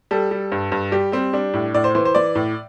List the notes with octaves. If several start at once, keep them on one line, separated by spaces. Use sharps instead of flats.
G3 A4
G3
G2
G2
G3 G4
G3 C4
G3 D4
A2
A2 D5
C5
E3 C5
C5
E3 D5
A2